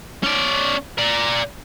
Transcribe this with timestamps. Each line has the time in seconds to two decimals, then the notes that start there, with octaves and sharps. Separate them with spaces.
0.24 C#4 D5
0.98 A#4 D5